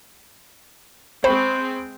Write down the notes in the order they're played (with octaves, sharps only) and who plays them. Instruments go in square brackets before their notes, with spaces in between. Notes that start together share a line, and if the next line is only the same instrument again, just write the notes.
[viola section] G#3 C4 [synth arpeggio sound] C5 [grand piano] G5 B5 C#6